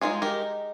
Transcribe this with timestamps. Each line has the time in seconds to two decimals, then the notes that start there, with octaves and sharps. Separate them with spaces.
0.01 G#3 C4 D#4 F4 G#4
0.22 G4 A#4